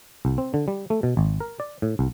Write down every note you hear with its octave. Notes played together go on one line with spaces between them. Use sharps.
C2
C4
D3
G3
A3
B2
G#1
A#4
D5
A2
C2